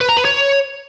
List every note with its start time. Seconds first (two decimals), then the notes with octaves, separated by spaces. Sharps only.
0.01 B4
0.09 A#5
0.17 B4
0.25 C#5